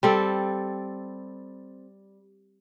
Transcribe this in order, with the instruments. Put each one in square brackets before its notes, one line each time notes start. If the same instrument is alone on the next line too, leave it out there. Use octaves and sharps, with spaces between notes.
[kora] G3 C4 A4